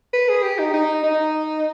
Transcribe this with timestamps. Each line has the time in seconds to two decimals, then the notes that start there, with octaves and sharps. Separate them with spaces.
0.14 B4
0.29 G#4
0.43 G4
0.59 D#4
0.74 D#4
1.04 D#4